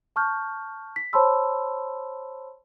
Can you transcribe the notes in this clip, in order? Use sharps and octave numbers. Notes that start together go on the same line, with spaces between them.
A5 C#6 F6 G6
B6
C5 C#5 A5 B5 C6 E6